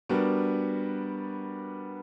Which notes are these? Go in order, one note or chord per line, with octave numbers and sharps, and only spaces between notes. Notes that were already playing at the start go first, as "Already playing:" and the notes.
G3 B3 D4 F#4 A#4